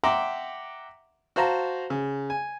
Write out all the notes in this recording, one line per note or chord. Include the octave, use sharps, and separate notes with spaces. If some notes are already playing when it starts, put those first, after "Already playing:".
E5 F#5 G5 A#5 C6 D6
F#4 C5 F5 A5 A#5
C#3
G#5